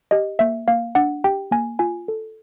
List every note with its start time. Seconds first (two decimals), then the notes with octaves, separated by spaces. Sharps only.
0.11 G4 D#5
0.39 A#3 E5
0.68 A#3 F5
0.95 D4 F#5
1.24 G4 G5
1.51 A#3 G#5
1.79 F4 G#5
2.08 A4